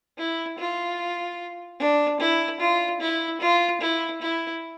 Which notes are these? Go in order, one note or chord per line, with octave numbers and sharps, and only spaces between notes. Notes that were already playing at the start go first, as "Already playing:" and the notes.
E4
F4
D4
E4
F4
E4
F4
E4
E4